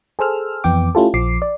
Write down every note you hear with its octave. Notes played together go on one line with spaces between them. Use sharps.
G#4 A4 C5 E6 F6
F2 E3 B3 G5 D6
A3 C#4 E4 F4 G4 A4
A#1 F3 D6 C7
D5